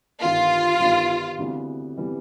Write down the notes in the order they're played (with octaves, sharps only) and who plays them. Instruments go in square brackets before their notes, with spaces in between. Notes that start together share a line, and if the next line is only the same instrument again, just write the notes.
[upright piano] G1 G2 D#3 G3 B3 [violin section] F4
[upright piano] G1 G2 D#3 G3 B3
D2 C3 E3 G3 B3
C3 E3 G3 B3